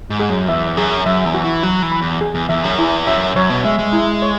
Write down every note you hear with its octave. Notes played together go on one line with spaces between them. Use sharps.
G#2
G#4
F#2
E2 E5
F#2 G#4
F#2 E5
E2
F#4
E3
F#3 F#4
E3
B5
E2
G#4
E2
E2 E5
F#2
E2 E4
F#2 E5
F#2 C#5
B2
G#3 E5
G#3
E4
C#5